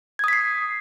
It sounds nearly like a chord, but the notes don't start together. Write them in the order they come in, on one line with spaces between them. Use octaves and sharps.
G#6 D#6 B6 C7